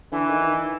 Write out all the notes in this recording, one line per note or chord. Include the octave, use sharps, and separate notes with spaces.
D3 E3
D#3
D#3